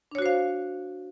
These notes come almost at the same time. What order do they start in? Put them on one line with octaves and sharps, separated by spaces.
D4 C#5 F#4 C5 F5